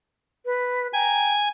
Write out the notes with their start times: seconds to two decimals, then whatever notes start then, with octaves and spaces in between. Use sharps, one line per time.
0.45 B4
0.94 G5 G#5 A#5